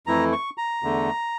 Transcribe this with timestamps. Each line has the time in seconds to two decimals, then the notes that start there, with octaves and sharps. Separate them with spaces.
0.07 F2 E3 A3 E4 A#5
0.32 C#6
0.58 A#5
0.83 E2 D3 A3